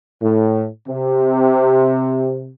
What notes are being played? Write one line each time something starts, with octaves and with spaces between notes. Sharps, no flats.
A2
C3